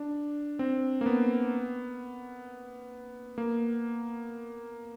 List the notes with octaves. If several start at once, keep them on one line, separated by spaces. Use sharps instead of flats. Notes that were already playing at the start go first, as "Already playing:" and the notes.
Already playing: D4
C4
A#3
B3
A#3